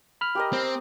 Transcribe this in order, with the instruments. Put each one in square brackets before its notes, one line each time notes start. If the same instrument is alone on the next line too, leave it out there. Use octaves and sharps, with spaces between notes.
[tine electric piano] B5 F6
[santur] G4 A#4 D#5
[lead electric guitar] C4